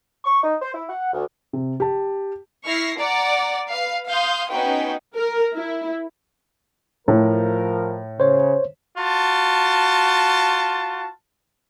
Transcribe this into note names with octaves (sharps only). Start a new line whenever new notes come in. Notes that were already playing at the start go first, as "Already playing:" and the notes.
C#6
D#4
C5
E4
F#5
D2
C3
G4 A5
E4 C#6 F6 A#6 C7
D5 F#5 A#5
B4 F5 C7
F5 C6 D#6 G6
B3 C#4 D#4 F#4 B4 G5
A#4
E4
A2 F3 A#4
C#3 C5 C#5
F4 F#4 A5